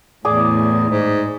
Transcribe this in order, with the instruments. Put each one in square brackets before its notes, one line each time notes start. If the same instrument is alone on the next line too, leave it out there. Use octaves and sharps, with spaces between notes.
[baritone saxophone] E2 [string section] A2 [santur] G#4 D5 D6
[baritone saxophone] G#2